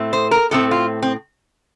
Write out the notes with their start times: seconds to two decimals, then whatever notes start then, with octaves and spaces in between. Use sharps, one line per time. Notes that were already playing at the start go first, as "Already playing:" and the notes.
Already playing: A2 A3 C4
0.13 C5
0.31 A#4
0.51 A2 A3 C4 A4
0.71 F4
1.02 C4